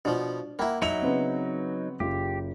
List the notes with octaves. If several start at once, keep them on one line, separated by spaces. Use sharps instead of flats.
B2 F3 D4
A#3 E4 F#5 G5 B5
F#3 D#4 E4 E5 C#7 F7
C#3 B3 C4
F#1 F4 G4